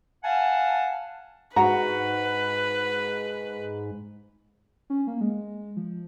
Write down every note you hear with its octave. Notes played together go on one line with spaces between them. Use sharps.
F5 F#5 G#5 A5
G#2 F#4 B4 A#5
C#4
A#3
G#3
F3